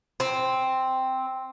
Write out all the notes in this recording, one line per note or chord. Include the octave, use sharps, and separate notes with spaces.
C4